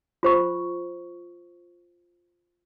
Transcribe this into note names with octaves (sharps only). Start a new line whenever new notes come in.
F4 C5 C#6